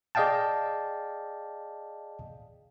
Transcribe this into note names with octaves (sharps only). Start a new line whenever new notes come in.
G#4 D5 D#5 F5 G5 A5